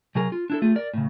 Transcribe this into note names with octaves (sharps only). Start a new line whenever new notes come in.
C3 F#3 G#4 A#4
F4
D4 E4 A4
A3 F4 G#4
A#4 D5
A2 C#3